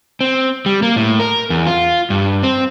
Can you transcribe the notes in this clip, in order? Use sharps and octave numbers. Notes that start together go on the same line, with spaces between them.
C4
G3
A#3
A2
A#4
E2
F4
G2
C4